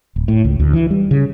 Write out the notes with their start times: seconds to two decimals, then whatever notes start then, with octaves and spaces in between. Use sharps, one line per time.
0.16 D1
0.28 A2
0.44 C#2
0.60 D2
0.73 E3
0.90 G3
1.11 C#3